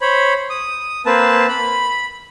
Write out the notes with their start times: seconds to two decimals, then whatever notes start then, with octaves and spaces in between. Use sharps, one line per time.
0.01 C5 C#5 B5
0.50 D#6
1.06 A#3 C4 B4 A5
1.49 B5